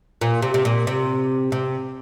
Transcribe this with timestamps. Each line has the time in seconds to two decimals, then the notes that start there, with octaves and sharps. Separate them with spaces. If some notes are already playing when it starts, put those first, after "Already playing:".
0.21 A#2
0.42 C3
0.54 C3
0.65 A#2
0.87 C3
1.52 C3